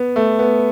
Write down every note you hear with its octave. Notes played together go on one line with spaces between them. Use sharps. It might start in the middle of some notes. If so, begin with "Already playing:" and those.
Already playing: B3
A3
B3